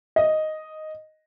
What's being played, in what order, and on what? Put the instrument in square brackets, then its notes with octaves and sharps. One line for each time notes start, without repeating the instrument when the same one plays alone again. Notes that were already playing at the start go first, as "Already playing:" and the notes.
[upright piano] D#5